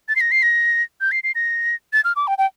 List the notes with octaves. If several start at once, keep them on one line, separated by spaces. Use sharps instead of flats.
A6
C7
A#6
C7
A#6
G6
C7
C7
A#6
A6
F6
D6
G5
G5